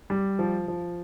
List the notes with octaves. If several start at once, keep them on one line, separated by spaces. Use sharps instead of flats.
G3
F3
F3